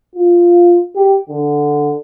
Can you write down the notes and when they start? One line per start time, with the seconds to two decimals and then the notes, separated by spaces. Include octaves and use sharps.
0.15 F4
0.96 G4
1.29 D3